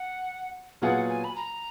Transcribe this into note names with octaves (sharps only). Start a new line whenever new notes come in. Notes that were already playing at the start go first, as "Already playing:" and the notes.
Already playing: F#5
A#2 F#3 B3 F4 G#4 F#5
G#5
B5
A#5